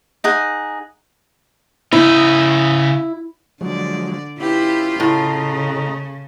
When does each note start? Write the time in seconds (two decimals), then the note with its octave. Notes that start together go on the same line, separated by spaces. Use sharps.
0.24 D#4 G#4 F#5
1.93 C#3 D#4 E4
3.61 D3 F3 F#3 G#3 D5
4.40 C#4 E4 F4 G4 B4
5.00 A2 C#3 D#5 A#5